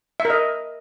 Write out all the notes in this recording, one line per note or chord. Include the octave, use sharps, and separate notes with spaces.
E5
A#4
D#5